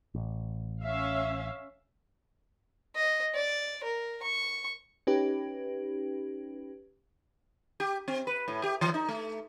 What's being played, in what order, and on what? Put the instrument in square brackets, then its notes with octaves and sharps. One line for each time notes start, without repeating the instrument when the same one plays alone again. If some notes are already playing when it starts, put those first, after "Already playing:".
[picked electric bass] A1
[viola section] C#4 E5 F5
[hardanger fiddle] D#5
D5
A#4
C#6
[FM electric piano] C#4 D#4 G4 B4
[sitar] G4
C4
B4
A2
G4
E3
D#4
A3